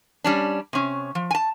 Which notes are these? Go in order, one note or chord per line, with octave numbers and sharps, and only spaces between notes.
G3 C#4 D4
C3 C#4
F3
G#5 A5